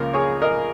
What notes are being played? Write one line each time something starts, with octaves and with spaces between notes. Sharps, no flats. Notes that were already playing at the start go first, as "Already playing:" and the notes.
Already playing: C#2 C#3 F3 A#3 F4 A#4
G#4 C#5
A#4 D#5